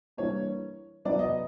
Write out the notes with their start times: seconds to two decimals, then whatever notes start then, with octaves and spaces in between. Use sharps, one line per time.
0.17 E3 G3 A#3 D4 C#5
1.05 F#3 B3 E4 D5
1.19 D#5